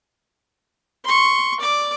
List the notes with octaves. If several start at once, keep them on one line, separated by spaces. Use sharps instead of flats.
C6 C#6
D5 D6